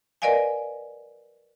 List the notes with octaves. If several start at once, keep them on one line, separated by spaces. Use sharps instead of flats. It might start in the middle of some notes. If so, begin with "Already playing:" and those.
A#4 B4 D5 D#5 F5 G#5